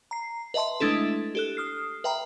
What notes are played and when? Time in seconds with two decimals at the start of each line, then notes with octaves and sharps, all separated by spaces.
0.11 A#5 C7
0.54 B4 D#5 E5 A5 C6
0.80 G#3 A3 D4 E4 A4
1.35 G4 A4 F#6
1.57 D#6 F6 C7
2.04 B4 E5 G5 A#5 B5